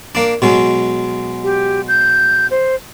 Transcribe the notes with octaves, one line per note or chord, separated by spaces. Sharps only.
A#3 D4
B2 F#3 G#3
G4
G6
C5